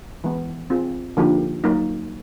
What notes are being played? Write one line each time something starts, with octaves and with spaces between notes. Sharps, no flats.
E3 G#3 B3
C4 F4 G#4
D3 F3 A#3 D#4 G4
F#3 A#3 D#4